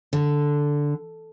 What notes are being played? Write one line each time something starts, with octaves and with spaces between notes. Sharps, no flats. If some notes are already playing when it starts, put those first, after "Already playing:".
D3